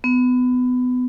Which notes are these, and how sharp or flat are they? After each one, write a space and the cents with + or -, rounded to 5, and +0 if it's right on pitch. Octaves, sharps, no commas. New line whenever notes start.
B3 +25